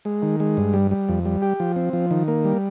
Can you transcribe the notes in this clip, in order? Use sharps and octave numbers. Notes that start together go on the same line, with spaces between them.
G#3
D#3
G#3
G2
G3
G3
F2
G3
G4
F3
C4
F3
D#3
A#3
G3